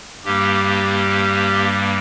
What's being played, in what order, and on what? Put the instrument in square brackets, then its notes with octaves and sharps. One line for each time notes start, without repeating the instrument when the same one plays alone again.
[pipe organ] G2 G3 A#3 G4